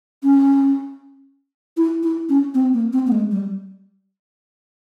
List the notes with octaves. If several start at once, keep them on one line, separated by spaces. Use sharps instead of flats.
C#4
E4
E4
C#4
C4
A#3
C4
A#3
G#3
G3